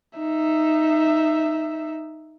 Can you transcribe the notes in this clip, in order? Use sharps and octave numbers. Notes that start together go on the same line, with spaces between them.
D#4 E5